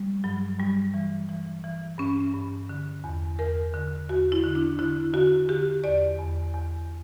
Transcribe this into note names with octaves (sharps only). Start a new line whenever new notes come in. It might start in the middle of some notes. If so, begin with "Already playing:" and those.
Already playing: G3
G2 F#3
G2 G3
E3
E3
E3
G2 C#4
G2
D3
E2
E2 A#4
D3
E2 F#4
E4
D3
D4
D3 E4
D3 F#4
D3 G4
E2 D5
E2
E2